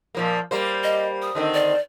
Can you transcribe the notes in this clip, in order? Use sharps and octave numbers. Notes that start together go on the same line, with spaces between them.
A#2 F3 A#3
G3 A#3 C5
D#5
D#6
D3 D#3 C4
D5